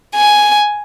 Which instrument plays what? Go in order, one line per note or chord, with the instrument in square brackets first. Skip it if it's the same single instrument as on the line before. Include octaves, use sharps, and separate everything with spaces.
[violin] G#5